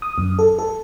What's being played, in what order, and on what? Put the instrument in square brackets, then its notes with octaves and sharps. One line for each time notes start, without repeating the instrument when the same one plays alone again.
[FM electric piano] D#6
F#2
A4
A4